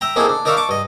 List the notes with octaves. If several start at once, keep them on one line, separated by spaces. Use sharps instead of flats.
E5 G5 A#5
A#3 C4 D#4 E4 G#4 A4
D4
D#4 A#4 D5 E5 F5 C#6
A5 C#6 D6
G2 D#5